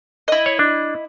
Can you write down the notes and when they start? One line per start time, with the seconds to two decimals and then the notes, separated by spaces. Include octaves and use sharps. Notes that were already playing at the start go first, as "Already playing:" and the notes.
0.28 E4 D#5
0.46 C#5
0.59 D4